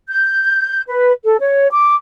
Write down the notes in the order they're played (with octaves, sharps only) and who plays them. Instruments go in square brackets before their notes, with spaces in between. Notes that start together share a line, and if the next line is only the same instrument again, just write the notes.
[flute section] G6
B4
A4
C#5
D6